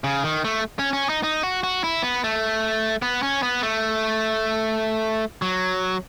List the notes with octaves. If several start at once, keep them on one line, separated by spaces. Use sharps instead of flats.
C#3
D#3
A3
C#4
C#4
D#4
D#4
F#4
F#4
E4
B3
A3
B3
C#4
B3
A3
F#3